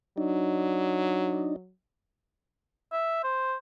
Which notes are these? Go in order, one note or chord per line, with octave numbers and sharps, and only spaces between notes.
F#3 D4 D#4
E5
C5